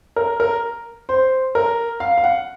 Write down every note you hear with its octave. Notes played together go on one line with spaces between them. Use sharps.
A#4
A#4
C5
A#4
F5
F5
F#5